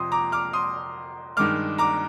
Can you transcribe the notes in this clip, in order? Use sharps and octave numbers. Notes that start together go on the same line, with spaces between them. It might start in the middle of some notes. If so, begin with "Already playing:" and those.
Already playing: F2 C3 F3 C6 D#6
A#5 D6
D6 F6
C6 D#6
G2 D#3 G#3 D6 F6
A#5 D6